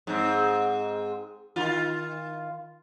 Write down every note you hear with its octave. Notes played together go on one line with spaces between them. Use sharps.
G#2 C4
D#3 F4